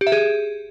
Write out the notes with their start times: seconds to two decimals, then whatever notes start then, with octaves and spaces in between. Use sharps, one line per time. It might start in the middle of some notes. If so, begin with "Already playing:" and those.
0.01 G4
0.07 E5
0.12 G#4